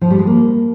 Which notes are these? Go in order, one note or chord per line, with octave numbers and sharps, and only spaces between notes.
F3
G3
G#3
A#3